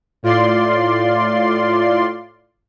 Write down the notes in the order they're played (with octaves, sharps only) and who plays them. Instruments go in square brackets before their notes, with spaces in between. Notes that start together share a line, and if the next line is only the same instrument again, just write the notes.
[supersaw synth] A2 F4 D5 C6